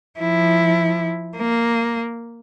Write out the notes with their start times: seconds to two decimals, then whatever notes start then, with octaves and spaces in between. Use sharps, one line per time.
0.20 F3 E4
1.37 A#3